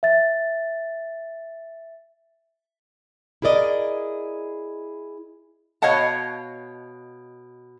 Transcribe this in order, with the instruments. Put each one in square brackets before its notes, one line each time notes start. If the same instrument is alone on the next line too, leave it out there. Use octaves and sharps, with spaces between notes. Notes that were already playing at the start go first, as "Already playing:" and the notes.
[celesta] E5 A6
[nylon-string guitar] E4 G#4 A#4 D5 D#5
[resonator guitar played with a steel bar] B2 C#5 D#5 F5 F#5 A5